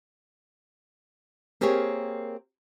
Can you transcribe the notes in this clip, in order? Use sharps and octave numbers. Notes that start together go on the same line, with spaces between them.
A#3 C4 G4 G#4 A#4 C#5